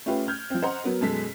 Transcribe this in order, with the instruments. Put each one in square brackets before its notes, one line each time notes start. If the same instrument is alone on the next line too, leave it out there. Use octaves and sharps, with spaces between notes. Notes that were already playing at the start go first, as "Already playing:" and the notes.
[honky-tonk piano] A3 C#4 F4 G4 B4
F6 G6 G#6
F3 C4
C5 D#5 F#5 A#5 C6
F#3 B3 A#4
F#2 B2 G#3 A4 B6